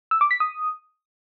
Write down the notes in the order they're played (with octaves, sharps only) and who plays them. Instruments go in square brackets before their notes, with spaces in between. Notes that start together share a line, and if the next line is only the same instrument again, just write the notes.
[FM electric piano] E6
D6
B6
D#6